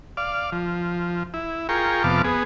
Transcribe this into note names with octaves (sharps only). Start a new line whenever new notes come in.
D5 F5
F3
E4
F4 G#4 A#4 G5 C#6
F2 C3 B3 F5 A5 D6
B3 G#4